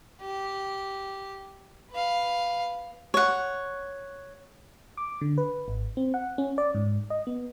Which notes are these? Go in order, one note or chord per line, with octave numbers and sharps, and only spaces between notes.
G4
B4 F5
C#5 F#5
D6
D3
B4
G#1
C4
F#5
C#4
D5
G#2
D#5
B3